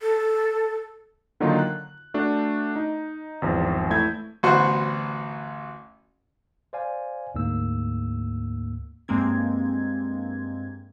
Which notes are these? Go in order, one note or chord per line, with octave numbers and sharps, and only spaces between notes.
A4
D3 D#3 F#3 A#3 D#4 F4
F#6
A3 D4 F#4
D#4
G#1 E2 F3
A3 E4 E5 G6 G#6
A1 D2 B3 F#4 C5 C#6
C5 D5 F5 G#5
D2 G#2 A#3 E6
G2 G#3 A#3 C4 G#6